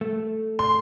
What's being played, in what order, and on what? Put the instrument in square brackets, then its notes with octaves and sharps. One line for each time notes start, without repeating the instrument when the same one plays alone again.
[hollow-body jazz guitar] A3
[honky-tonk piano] C6